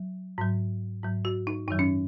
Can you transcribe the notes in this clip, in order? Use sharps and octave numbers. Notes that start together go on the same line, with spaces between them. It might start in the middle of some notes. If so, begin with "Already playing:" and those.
Already playing: F#3
G#2 F#3
G#2 F#3
F#4
D#4
F#2 D#3 F#3 D#4
C#4